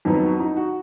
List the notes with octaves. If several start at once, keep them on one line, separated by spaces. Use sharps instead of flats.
F2 D#3 F#3 B3 D#4
F#4
D#4
F#4